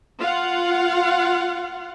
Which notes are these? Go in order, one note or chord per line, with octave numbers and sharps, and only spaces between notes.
F4 F5 F#5